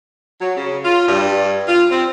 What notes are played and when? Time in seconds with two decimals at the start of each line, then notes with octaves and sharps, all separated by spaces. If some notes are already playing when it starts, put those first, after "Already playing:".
0.40 F#3
0.56 C#3
0.84 F4
1.07 G2
1.67 F4
1.90 C4